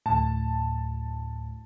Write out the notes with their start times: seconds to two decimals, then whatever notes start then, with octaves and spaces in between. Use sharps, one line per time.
0.06 D2 A2 A5